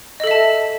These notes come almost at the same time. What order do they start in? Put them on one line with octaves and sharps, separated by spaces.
D#5 A4 E5 A5